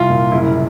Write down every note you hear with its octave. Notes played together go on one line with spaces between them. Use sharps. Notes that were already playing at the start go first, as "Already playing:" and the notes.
Already playing: C2 F4
A#2
F#1 E4